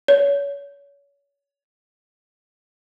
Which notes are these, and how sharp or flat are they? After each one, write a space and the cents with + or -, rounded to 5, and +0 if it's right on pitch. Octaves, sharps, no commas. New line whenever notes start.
C#5 +30